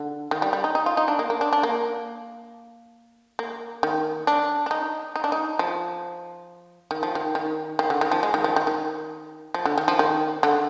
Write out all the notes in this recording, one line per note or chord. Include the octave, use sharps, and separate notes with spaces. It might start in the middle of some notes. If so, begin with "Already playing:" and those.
Already playing: D3
D#3
G3
G3
D#4
D#4
F4
D#4
D4
A#3
A#3
D4
D4
A#3
A#3
D#3
D4
D4
D#4
D#4
D4
D#4
F3
D#3
F3
D#3
D#3
D#3
D3
D#3
F3
G#3
D#3
F3
D#3
D#3
F3
D3
D#3
F3
D#3
D3